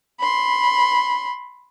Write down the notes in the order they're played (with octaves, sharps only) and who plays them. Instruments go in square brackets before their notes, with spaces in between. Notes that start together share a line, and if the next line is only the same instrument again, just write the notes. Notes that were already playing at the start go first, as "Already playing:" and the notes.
[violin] B5 C6